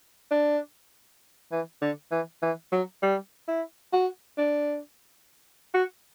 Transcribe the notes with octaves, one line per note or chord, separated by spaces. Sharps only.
D4
E3
D3
E3
E3
F#3
G3
E4
F#4
D4
F#4